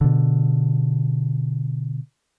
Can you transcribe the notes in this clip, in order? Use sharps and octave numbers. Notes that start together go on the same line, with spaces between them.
B2 D3